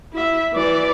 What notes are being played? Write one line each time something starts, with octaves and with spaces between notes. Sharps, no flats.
E4 E5
E3 D5